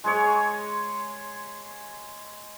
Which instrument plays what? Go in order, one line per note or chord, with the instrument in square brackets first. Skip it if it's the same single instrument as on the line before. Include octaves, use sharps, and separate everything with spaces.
[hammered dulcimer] G#3 G#4 C#5